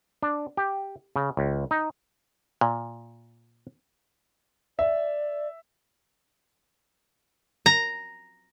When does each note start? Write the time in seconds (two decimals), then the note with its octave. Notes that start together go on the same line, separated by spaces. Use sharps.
0.23 D4
0.57 G4
1.16 C#3
1.37 C#2
1.71 D#4
2.61 A#2
4.79 D5 E5
7.66 A#5